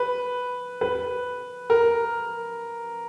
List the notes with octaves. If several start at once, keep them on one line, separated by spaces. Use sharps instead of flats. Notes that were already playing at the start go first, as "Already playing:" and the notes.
Already playing: B4
B4
A#4